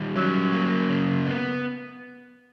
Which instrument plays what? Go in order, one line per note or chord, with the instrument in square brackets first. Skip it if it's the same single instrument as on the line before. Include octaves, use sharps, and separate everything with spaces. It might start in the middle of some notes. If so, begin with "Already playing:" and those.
Already playing: [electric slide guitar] D#3 G3
[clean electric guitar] F#3 [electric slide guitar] C#4
[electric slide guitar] A#3
C#3
B3